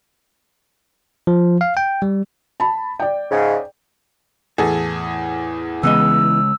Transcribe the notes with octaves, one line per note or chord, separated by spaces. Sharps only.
F3
F5
G5
G3
A5 B5
D5 G5
G#2 C#3
E2 A2 G#4 A4
C#3 E3 G#3 B3 D#5 E6